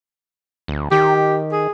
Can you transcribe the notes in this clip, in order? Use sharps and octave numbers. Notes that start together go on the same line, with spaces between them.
D2
D#3 G4
G#4